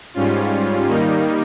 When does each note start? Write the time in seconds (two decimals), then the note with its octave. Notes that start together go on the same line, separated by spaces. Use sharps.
0.14 G#2 G3 C#4 F4
0.86 D#3 G3 A#3 D#4